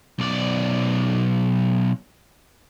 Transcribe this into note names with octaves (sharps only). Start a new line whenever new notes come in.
B1 D5